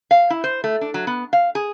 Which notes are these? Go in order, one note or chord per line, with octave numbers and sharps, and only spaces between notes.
F5
E4
C5
A3
D4
F#3
B3
F5
G#4